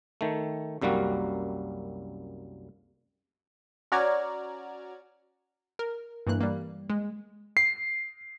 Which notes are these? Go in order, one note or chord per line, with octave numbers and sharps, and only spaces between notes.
D#3 A3
C2 F#2 G3 A#3 F#4
C#4 F#4 D5 A#5 F6 G#6
A#4
G2 E3 A#3 F#6
G3 A#3
G#3
C7